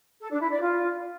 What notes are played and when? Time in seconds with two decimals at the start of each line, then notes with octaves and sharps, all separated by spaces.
0.20 A4
0.30 D4
0.40 E4
0.50 D5
0.60 F4